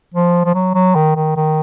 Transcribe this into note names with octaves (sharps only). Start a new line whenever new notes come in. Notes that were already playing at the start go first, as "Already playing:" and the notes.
F3
F3
F#3
F#3
D#3
D#3
D#3